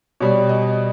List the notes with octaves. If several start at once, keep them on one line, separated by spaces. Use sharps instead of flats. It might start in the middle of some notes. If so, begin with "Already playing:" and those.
B2 G3 C#5
D#5